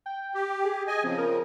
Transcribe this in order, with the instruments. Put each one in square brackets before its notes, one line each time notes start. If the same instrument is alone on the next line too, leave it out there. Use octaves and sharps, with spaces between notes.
[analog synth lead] G5
[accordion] G4
[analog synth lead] G#4
[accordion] D#5 G#5
[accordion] C#3 F3 [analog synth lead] C4
[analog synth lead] A#4